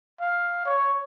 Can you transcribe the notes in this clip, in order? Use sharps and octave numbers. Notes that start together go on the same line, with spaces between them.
F5
C#5